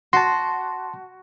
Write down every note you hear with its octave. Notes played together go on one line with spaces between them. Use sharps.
F#4 A5 C6